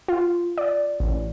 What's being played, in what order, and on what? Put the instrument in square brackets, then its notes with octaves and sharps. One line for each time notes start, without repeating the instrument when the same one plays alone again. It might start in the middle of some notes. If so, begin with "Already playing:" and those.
[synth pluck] F4
D5
A1